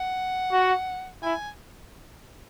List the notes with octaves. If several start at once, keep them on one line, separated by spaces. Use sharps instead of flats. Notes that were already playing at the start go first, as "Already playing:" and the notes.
Already playing: F#5
F#4
E4 G#5